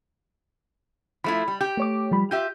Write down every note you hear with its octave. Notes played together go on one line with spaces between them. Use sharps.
F3 A3 E4 B5
G3
G4 G6
A3 C#5 D6
F3 G3 B5
F4 G4 E5 G6